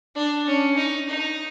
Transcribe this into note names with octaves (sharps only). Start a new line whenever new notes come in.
D4
C#4
D#4
D#4